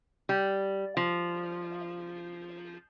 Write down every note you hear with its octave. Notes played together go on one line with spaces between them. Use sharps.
G3
F3